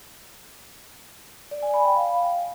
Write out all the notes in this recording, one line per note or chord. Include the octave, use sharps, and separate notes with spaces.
D5
G#5
B5
G5
F5